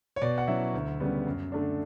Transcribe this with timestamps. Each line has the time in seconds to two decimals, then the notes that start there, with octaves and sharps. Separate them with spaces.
0.16 C#5
0.22 B2 D5
0.38 F#5
0.48 F#3 C#4 E4 E5
0.74 D2
1.00 C#3 G3 B3
1.27 F#2
1.52 D3 A3 D4